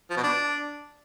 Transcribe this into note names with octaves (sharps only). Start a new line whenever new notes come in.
F3
B2
D4